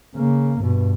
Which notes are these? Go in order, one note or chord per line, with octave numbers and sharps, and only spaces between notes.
C#3 A#3
G2 B2